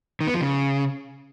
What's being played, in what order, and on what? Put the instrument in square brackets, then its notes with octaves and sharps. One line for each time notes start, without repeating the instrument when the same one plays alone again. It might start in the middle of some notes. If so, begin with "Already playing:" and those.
[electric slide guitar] D#3
B3
F3
C#3